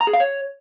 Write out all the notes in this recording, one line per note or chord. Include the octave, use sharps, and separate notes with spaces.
A#5
G#4
F5
C#5